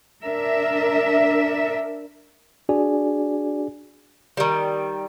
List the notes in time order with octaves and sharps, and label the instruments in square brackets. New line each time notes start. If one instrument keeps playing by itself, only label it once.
[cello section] D4 A#4 E5
[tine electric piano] D4 F#4 G#4 D5 G#5
[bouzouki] D#3 G3